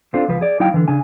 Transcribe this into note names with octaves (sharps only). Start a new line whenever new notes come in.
C4 D4 F4 A4 C5
C#2 F3 B4
G#4 D5
F#3 D#4 E4 D#5 F5 G5
D3 E3
C#3 D4 G#5